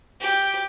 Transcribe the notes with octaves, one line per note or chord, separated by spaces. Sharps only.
G4